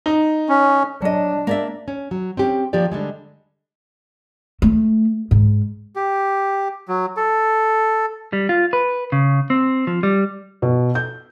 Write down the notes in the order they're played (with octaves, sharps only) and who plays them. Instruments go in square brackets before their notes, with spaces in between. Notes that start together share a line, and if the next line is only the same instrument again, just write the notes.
[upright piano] D#4
[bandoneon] C#4
[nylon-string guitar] F#3 D#5 [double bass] D4
[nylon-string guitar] A#3 D5 E5
C#4
F#3
C4 C#4 G4
F3 A#3 G4 D5
D3 G3 G#3
[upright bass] A3
G#2
[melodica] G4
F#3
A4
[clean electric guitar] G3
F4
B4
C#3
C4
F3
G3
[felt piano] B2
G6